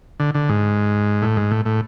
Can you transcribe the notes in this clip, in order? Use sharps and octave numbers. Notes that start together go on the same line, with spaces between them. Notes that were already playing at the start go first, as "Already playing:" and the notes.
D3
D3
G#2
A2
G#2
A2
A2